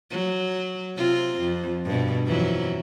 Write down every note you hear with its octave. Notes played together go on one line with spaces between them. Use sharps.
F#3
C3 C4 F4
F2
G2 B2
F2 E3 F#3